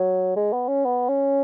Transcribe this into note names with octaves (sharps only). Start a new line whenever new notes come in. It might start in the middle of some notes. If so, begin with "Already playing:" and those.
Already playing: F#3
G#3
B3
C#4
B3
C#4